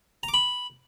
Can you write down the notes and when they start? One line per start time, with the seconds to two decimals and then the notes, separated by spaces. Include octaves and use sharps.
0.23 A#5
0.28 D6
0.34 B5